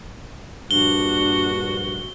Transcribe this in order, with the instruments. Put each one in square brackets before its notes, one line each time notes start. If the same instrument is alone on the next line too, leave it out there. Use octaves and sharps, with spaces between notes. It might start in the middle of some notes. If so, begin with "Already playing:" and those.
[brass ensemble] A#1 G2 [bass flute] D4 [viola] F#4 [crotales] G7